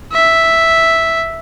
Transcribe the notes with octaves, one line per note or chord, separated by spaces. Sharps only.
E5